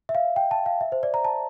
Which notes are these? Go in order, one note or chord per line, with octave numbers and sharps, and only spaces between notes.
E5
F5
G5
A5
F5
E5
C5
D5
A#5
A5